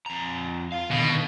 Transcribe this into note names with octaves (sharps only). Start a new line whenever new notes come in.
F2 A#5
F4 F5
B2 D3 D#3